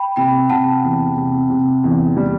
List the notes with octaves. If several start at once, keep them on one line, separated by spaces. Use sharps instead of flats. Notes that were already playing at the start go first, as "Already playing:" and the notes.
Already playing: G5 B5
C3 G5 B5
C3 F#5 A5
E2
C3
C3
E2
G3